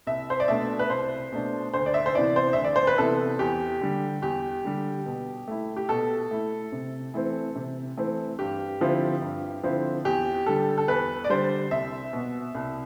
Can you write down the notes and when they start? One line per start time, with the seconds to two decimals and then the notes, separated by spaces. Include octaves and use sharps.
0.07 C2 E5
0.30 C5
0.40 D5
0.48 B2 A3 D4 E5
0.79 B4
0.90 C2 C5
1.32 B2 A3 D4
1.74 D2 C5
1.86 D5
1.94 E5
2.06 C5
2.15 C3 E3 B3 E4 D5
2.36 C5
2.53 D2 E5
2.64 D5
2.76 C5
2.87 B4
2.98 C3 E3 B3 E4 A4
3.39 E2 G4
3.81 D3 G3
4.22 E2 G4
4.64 D3 G3
5.06 B2
5.48 A3 E4
5.77 G4
5.89 B2 A4
6.31 A3 E4
6.72 C3
7.14 E3 A3 C4
7.56 C3
7.97 E3 A3 C4
8.39 G2 G4
8.80 D3 F3 C4 E4
9.22 G2
9.64 D3 F3 C4 E4
10.05 E2 G4
10.46 D3 G3 A4
10.78 A4
10.88 E2 B4
11.24 D5
11.30 D3 G3 C5
11.71 C2 E5
12.13 B2 B3
12.55 C2